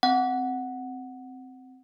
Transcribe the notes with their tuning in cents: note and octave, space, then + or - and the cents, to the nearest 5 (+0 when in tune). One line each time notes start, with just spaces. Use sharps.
C4 -10 F#5 +0